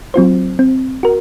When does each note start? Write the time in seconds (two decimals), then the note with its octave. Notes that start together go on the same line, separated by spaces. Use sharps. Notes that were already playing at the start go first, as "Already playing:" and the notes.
0.14 F#3 C4 F4 C5
0.59 C4
1.03 F#4 A#4